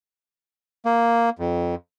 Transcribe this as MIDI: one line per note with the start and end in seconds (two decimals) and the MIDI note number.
0.86 1.30 58
1.39 1.75 41